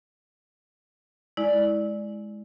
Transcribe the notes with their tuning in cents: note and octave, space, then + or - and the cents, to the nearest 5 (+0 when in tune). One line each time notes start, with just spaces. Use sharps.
G#3 +15 E4 -20 D5 +0